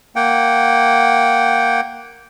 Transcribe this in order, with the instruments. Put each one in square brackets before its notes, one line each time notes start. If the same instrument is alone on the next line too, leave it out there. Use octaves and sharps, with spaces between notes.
[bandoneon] A#3 F#5 G5